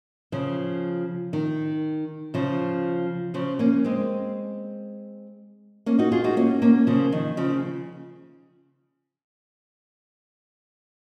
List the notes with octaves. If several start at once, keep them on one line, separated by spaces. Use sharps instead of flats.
C#3 F3
D#3
C#3 F3
C#3 F3
A#3 C#4
G#3 C4
A#3 C#4
D#4 F#4
F4 G#4
D#4 F#4
A#3 C#4
A#3 C#4
C#3 F3
D#3
C#3 F3